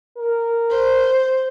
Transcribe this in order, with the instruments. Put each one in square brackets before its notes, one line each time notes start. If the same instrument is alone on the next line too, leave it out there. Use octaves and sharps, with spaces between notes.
[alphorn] A#4
[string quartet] C5